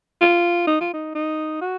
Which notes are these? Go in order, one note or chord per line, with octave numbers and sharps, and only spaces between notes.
F4
D#4
F4
D#4
D#4
F#4